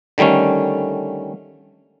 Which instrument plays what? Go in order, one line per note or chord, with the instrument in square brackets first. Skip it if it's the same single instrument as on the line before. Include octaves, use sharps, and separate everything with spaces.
[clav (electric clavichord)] D3 D#3 G3 A3 C#4